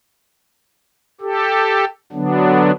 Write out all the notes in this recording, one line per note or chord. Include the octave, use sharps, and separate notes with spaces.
G4 A4
D3 F#3 B3 D4